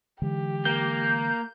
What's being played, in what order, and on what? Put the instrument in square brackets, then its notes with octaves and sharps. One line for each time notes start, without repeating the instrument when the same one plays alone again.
[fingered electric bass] D3 E3 G#3 [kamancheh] G4
[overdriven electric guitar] A#3 [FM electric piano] G6